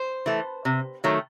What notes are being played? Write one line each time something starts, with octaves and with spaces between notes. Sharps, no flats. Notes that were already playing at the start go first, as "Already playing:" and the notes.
Already playing: C5
E3 A3
C3
D#3 F#3 A3